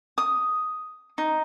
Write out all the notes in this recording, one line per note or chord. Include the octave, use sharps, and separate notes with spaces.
D#6
D#4